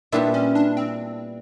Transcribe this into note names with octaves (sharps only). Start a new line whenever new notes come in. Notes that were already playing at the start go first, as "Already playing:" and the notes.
A#2 G3 B3 D4 E4
C#4
D4
C4